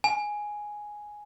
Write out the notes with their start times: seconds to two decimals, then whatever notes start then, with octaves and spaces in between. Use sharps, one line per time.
0.04 G#5